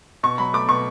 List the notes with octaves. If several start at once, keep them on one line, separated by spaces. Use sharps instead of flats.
B2 C#6
F#3 B5
A3 D6
B2 C#6